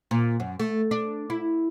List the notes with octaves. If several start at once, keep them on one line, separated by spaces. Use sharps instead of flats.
A#2
F#2
A3
D4
E4